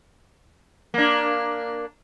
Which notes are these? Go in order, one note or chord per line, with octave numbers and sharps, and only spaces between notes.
A#3 D4